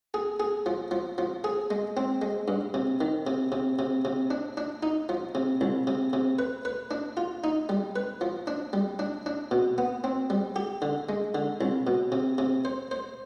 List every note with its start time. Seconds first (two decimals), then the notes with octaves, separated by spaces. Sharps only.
0.14 G#4
0.40 G#4
0.66 F3
0.91 F3
1.18 F3
1.44 G#4
1.71 G#3
1.97 C4
2.22 G#3
2.48 G2
2.74 C3
3.01 D#3
3.27 C3
3.52 C3
3.79 C3
4.05 C3
4.31 D4
4.57 D4
4.83 D#4
5.09 F3
5.35 C3
5.61 C2
5.87 C3
6.13 C3
6.39 B4
6.65 B4
6.91 D4
7.17 F4
7.44 D#4
7.69 G3
7.96 B4
8.21 F3
8.47 D4
8.73 G3
8.99 D4
9.26 D4
9.51 B2
9.78 B3
10.04 C4
10.30 G3
10.56 G4
10.82 D3
11.09 G#3
11.35 D3
11.61 C2
11.87 B2
12.12 C3
12.38 C3
12.65 C5
12.91 C5